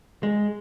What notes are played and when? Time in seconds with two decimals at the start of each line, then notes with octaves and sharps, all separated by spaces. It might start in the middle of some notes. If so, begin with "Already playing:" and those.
0.23 G#3